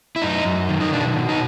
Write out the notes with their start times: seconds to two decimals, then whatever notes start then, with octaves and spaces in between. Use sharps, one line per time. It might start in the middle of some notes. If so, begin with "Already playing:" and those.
0.16 E4
0.22 F#2 D#4
0.45 F#2
0.69 D#3
0.81 D#4
0.93 B2 D4
1.16 B2
1.29 D#4